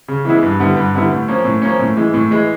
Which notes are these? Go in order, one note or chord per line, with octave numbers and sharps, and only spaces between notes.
C#3
E3 G#3 B3 E4
G2
D3 G3 B3 E4
G2
D3 G3 B3 E4
A2
F3 A#3 C#4
A2
F3 A#3 C#4
A2
E3 G#3
A2
E3 G#3